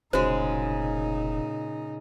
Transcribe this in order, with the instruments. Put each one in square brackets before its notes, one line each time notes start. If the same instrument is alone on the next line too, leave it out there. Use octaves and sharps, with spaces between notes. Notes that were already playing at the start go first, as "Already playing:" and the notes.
[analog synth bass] F1 [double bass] A#2 D#4 [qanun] C#3 G#3 [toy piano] F#4 C5